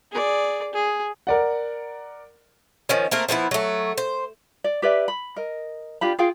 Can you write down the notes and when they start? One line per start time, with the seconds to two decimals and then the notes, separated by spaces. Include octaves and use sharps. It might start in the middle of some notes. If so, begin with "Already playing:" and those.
0.11 G#4 D5
0.73 G#4
1.27 A#4 D5 F#5
2.89 D#3 F3 C#4
3.11 A3 A#3 C4 A#4
3.28 F3 A3 B3 E4
3.51 F#3 A3
3.97 C5
4.64 D5
4.82 G4 B4 D5 E5
5.08 B5
5.36 A#4 D#5
6.01 D4 F4 G4 B5
6.19 F4 G#4 F5 G5